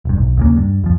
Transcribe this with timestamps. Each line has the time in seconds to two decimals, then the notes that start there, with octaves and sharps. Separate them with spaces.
0.05 E1 G2
0.17 B1
0.37 D#2 C#3 A#3
0.57 G2
0.84 F2 F3